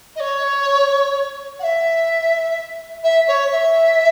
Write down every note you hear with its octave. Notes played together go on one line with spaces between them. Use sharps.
D#5
C#5
F#5
E5
E5
C#5
E5